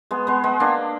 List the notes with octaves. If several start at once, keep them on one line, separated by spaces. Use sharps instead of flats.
G#3 B3
G#3 B3
G#3 B3
A#3 D4